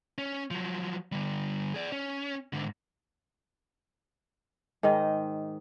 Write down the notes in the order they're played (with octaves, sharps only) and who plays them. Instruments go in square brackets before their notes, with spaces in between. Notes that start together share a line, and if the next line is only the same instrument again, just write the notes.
[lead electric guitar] C#4
F3 F#3
D3 G3
G#4 D5
C#4
G#2 D3
[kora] G#2 D#3 D#4 D#5